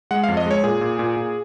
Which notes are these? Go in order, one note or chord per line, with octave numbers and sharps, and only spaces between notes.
G#3 F#5
F5
F2
D#5
G#3 C#5
A#2 G#4
A#2
A#2
A#2